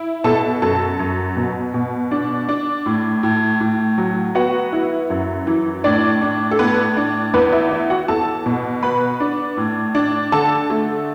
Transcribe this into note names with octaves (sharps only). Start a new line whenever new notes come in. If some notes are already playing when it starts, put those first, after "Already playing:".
Already playing: E4
B2 A4 A5
F#2 A4 A5
F#2
B2
B2
D4
D4
A2
A2
A2
F#3
B3 F#4 F#5
E4
F#2
E3
A2 D4 D5
D4
A4
A2 B3 B4
D4
E2 B3 B4
E4 E5
E3 E4 E5
F#4 F#5
E2 A4 A5
B2
B3 B4 B5
D4
A2
D4
D3 A4 A5
A3